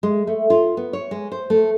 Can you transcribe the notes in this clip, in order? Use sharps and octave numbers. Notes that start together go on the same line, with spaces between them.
G#3
A3
F4
B3
C#5
G#3
C5
A3